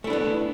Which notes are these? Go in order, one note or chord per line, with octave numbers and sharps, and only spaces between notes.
A3 B3 D4 E4